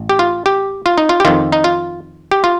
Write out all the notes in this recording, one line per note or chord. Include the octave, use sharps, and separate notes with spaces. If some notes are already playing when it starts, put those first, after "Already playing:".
Already playing: A1
G4
F4
G4
F4
D#4
F4
G4
F2 D#3 F4
D#4
F4
G4
F4